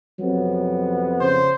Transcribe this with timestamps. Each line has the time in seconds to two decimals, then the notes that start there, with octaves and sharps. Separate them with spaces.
0.19 F2 C3 F#3 B3
1.21 C#3 C5